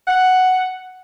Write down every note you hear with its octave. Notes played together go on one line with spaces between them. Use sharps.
F#5